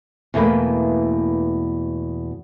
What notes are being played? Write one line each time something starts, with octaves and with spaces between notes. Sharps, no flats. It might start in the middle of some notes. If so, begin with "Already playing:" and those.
E2 B2 A3 A#3 E4 B4